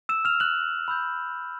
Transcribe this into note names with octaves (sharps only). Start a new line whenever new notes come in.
E6 E7
F6 F7
F#6 F#7
B5 E6 G6